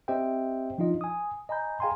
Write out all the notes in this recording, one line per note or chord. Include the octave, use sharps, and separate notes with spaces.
C4 G4 C5 D#5 E5 G5
F3 D4 D#4 F4 D#5
G#5 D#6
D#5 G#5 A#5 B5 G6
G#4 F5 G5 G#5 A#5 C6